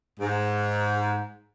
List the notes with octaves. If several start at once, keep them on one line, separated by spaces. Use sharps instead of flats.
G#2